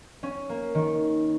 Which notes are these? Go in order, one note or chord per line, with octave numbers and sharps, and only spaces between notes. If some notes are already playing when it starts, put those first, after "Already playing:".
C#4
A#3
D#3